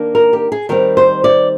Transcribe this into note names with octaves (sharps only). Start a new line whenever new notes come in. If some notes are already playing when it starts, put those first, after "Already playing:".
Already playing: D#3 A#3 D4
A#4
G4
G#4
D#3 G3 C4 A#4
C5
D5